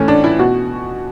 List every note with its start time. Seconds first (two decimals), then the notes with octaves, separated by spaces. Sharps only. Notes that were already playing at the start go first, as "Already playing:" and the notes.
Already playing: A2 E3 A3 C#4
0.08 D4
0.24 E4
0.39 B2 F#4